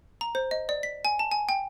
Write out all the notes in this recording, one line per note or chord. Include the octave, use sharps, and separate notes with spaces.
A#5
C5
D#5
D5
B6
G#5
A5
G#5
G5